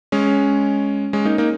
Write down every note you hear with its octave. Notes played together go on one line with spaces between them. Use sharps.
G#3 C#4
G#3 C#4
A#3 D#4
A#3 D#4